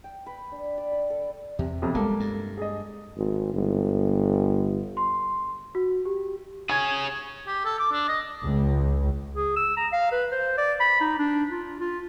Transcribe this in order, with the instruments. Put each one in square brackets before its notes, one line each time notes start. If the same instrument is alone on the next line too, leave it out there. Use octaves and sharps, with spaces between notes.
[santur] G5
B4
D4
D5
B5
A4
[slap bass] E2 [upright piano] C3
[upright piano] B1 F2 C3
[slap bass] G3 [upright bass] G#3 [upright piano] A#3 A4
[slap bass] G2
[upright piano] G#4 D#5
[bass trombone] G#1
G1
[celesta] C6
F#4
G4
[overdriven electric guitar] G#4 C#5 [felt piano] G#5 G#6
[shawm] G4
A4
D6
D4
D#5
[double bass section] C#2
[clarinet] G#4
E6
A#5
F5
B4
C5
D5
B5
D#4
D4
F4
F4